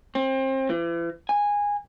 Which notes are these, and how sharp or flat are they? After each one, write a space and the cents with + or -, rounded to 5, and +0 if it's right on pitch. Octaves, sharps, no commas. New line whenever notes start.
C4 +30
E3 +40
G#5 -15